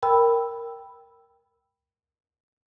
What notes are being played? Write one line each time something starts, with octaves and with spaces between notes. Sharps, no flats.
A#4 G5 B5 E6